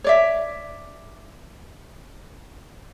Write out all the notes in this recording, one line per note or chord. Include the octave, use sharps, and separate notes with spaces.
C#5 D5 E5